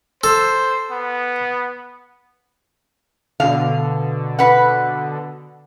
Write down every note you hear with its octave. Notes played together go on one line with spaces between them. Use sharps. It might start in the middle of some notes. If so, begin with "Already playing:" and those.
A4 C5
B3
B2 D3 F5
B4 F#5